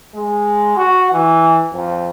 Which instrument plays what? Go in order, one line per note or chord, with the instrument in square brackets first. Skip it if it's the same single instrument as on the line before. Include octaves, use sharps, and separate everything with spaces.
[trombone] G#3
F#4
E3
F2